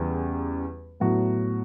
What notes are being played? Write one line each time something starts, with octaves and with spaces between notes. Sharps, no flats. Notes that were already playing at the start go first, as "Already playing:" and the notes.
Already playing: E2 C#3 E3 G3
A2 F#3 B3 F#4